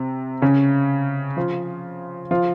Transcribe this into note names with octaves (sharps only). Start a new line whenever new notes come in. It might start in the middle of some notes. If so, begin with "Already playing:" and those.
Already playing: C3
C#3 C#4
F3 F4
F3 F4